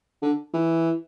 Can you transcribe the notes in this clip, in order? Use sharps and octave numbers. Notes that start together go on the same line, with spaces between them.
D3
E3